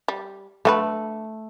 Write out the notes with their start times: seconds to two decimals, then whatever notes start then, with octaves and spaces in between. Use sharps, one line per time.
0.08 G3
0.65 D3 A3 F4 B4